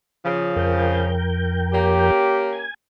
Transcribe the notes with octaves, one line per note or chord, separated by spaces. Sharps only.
C#3 F3
F2 A#4 G5
A#3 C#4 G4
G#5